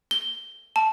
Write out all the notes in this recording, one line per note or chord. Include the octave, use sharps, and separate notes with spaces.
G7
A5